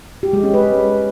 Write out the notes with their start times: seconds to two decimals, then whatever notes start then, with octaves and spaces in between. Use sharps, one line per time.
0.23 G4
0.33 G#3
0.44 C#4
0.54 B4